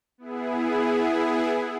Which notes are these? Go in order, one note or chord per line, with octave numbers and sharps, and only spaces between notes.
B3 E4 G#4